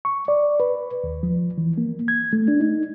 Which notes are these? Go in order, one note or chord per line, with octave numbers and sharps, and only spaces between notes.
C#6
D5
B4
D#2
F3
E3
A#3
G#6
A3
D4
D#4